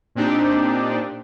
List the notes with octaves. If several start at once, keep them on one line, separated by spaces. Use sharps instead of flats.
A#2 C4 D4 D#4 G4